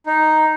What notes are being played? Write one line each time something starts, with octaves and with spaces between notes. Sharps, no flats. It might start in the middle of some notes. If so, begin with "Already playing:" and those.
D#4